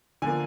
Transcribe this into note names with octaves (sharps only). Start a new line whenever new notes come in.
D3 F3 A#3 G#5